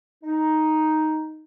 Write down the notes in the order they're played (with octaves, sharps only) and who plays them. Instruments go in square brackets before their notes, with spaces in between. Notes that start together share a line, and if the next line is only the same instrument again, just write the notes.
[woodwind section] D#4